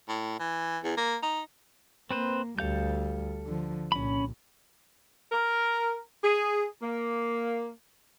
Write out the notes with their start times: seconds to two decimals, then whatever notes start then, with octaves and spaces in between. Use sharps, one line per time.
0.08 A2
0.39 E3
0.83 E2
0.97 A#3
1.22 D#4
2.11 A#3 C4 B4 C5
2.59 D2 G3 A4 F5 G6
3.46 D3 F3
3.92 C2 A#2 C#4 B5
5.32 A#4
6.24 G#4
6.82 A#3